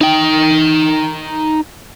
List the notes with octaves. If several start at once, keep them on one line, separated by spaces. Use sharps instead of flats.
D#4 G5